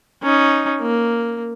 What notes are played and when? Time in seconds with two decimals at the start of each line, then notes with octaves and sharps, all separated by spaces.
0.22 C#4 D#4
0.81 A#3